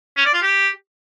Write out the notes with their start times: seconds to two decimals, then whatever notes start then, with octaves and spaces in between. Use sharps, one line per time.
0.17 C#4
0.26 D5
0.34 F4
0.42 G4